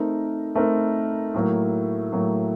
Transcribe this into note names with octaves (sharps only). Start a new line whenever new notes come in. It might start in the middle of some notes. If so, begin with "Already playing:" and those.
Already playing: A3 C4 D#4 A#4
A3 C4 D#4 A#4
A2 F#3 A#3
A2 F#3 A#3